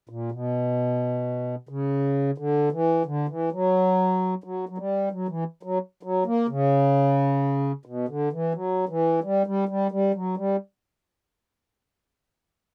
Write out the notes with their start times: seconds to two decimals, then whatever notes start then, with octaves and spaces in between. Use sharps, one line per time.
0.09 A#2
0.32 B2
1.69 C#3
2.38 D3
2.72 E3
3.06 D3
3.29 E3
3.52 F#3
4.44 F#3
4.69 F#3
4.78 G3
5.12 F#3
5.29 E3
5.63 F#3
6.03 F#3
6.26 A#3
6.49 C#3
7.86 B2
8.08 D3
8.32 E3
8.54 F#3
8.89 E3
9.23 G3
9.47 G3
9.69 G3
9.91 G3
10.15 F#3
10.37 G3